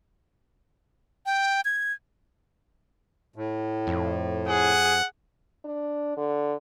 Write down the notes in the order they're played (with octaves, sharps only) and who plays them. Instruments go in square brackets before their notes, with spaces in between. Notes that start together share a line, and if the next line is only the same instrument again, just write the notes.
[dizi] G5
G#6
[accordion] A2
[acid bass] F2
[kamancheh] G#4 [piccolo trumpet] F#5
[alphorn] D4
D3